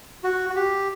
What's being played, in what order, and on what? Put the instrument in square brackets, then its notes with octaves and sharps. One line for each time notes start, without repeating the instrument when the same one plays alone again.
[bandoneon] F#4
F#4
G4